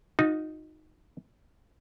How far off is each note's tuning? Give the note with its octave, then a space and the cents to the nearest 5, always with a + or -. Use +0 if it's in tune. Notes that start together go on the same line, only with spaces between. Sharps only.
D#4 +0 F#4 -45